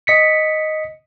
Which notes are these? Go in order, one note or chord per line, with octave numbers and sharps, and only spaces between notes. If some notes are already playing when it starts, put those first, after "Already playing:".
D#5 B6 C#7